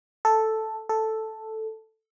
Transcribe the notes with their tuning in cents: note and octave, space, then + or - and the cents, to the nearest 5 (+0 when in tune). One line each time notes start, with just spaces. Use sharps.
A4 +0
A4 +0